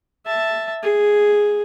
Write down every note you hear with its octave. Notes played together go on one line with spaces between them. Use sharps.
E5 A5
G#4